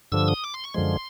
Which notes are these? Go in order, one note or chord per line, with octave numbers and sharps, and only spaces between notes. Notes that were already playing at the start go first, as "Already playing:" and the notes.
G2 D3 F3 E6
D#6
D6
C6
C#6
F#2 D3 F3 G#3 C6